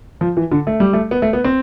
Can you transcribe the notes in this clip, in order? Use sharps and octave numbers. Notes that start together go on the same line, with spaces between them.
F3
E3
D3
A3
G3
A3
B3
A3
B3
C4